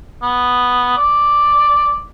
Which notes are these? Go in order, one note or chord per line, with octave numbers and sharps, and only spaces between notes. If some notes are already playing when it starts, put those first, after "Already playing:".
B3
D5